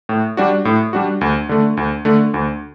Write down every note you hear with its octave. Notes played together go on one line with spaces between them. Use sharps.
A2
G3 D4 F#4
A2
G3 D4 F#4
D2
D3 A3
D2
D3 A3
D2